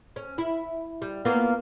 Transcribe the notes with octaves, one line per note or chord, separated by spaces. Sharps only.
C#4
E4
G3
A#3 B3 F4